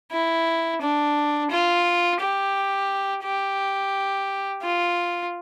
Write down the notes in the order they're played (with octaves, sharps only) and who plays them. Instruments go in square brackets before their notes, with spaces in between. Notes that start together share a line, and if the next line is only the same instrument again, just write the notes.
[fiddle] E4
D4
F4
G4
G4
F4